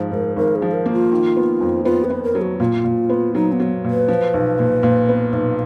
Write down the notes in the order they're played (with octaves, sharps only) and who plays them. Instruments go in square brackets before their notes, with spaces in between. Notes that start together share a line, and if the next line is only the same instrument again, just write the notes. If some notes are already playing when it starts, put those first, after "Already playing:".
Already playing: [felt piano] G#2 F3
[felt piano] G#2 [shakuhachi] A#4
[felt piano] G#1 [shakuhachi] A#4
[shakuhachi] G#4
[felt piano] F3
[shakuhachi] A#4
[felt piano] A#3
[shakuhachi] F4
[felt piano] D#3
B3
F2
[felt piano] B3 [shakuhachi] F4
[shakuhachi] B4
[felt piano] B3
[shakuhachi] A#4
[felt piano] F#3
[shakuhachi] F#4
[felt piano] A#2 [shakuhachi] F4
[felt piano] A#2
B3
[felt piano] F#3 [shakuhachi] D#4
[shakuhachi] B3
[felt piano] F#3
A#2
[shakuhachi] B4
[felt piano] F3
B1
A#2
A#2
B3
B1